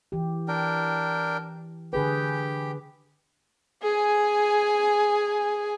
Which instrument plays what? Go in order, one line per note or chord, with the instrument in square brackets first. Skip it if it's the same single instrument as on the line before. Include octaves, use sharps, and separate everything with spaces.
[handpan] E3 G4
[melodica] D4 A#4 G5
[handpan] D3 G#4 B4 [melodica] G4 G5
[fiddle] G#4 G#5